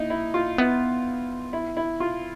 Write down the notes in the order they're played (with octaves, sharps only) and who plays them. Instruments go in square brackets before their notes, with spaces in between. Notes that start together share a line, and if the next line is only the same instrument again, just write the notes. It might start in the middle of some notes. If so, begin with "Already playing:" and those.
Already playing: [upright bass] A#3 [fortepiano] D#4 E4
[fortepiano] E4
F4
[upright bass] B3 [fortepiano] E4
[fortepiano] E4
E4
F4